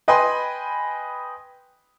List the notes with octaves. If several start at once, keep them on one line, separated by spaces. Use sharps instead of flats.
B4 D#5 G5 G#5 B5 C6